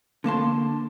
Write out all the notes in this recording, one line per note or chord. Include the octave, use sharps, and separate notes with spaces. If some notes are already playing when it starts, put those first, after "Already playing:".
D3 A#3 A5 C6